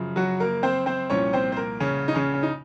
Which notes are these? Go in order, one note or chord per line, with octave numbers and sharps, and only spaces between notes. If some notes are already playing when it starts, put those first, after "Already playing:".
Already playing: F#2 C#3 F3
F#3 F#4
A#3 A#4
C4 C5
C4 C5
C2 A#2 F3 C#4 C#5
C4 C5
C5
A#3 A#4
C#3 C#4
D#4
C#3 C#4
C#4
D#4